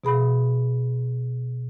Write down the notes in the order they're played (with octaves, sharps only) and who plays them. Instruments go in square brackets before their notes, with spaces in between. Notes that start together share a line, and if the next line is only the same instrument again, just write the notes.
[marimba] B2 G#4 B5